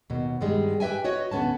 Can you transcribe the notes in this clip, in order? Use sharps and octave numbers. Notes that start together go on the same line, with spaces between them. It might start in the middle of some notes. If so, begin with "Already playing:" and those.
D#2 B2
G2 D#3 G3 G#3
G4 B4 E5 G5 G#5
F#4 B4 C#5 D#5
D2 D3 B3 C#4 A5